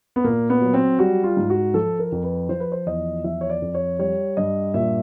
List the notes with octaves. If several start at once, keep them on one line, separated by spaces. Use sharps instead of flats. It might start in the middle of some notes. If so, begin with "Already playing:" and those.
B3
A#2 A#3
B3
F#3
C4
G3 F#4
F4
G#2
F#4
F3 A4
A#4
F2
B4
F3 C5
B4
C5
E2 D#5
F3 E5
C#5
D5
F2
C#5
G3 C#5
G2 D#5
A#2 E5